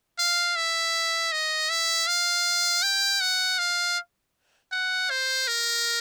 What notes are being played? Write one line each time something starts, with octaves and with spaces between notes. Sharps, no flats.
F5
E5
D#5
E5
F5
G5
F#5
F5
F#5
C5
A#4